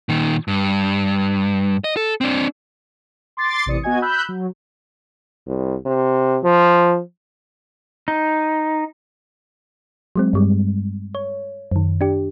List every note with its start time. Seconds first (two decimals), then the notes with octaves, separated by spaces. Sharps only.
0.09 A#2 D#3
0.48 G2
1.84 D#5
1.97 A4
2.21 C4 D4
3.37 C6 D6 A6 C7
3.66 A1 C3 E3 D5 D#6 C#7
3.83 B3 F#4 D#5 G#5 G#6
4.02 B5 E6 F#6 G6
4.29 F#3
5.47 C2
5.86 C3
6.44 F3
8.08 D#4
10.16 F#3 G#3 C4
10.33 G2 G3 G#3
11.15 C#5
11.72 F#2 D#3
12.01 D4 G4